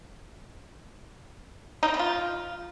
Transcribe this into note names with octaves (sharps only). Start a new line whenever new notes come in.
D#4
C4
B3
F4